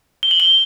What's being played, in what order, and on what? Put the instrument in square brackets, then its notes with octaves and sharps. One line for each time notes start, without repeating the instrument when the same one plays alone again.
[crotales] G7
F#7
G7